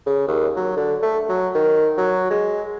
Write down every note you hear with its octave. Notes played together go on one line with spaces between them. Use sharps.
C#3
D#2
F#3
D3
A3
F#3
D#3
F#3
G#3